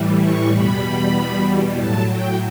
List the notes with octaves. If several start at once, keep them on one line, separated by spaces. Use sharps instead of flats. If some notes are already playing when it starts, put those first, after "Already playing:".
Already playing: A2 E3 G3
C#6
E2 B2 G3 B5
A2 F#3 A5
G5